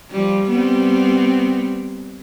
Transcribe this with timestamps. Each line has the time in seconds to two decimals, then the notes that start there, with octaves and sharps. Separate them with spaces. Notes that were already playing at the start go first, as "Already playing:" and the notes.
0.11 F3 G3
0.48 G3 B3 C4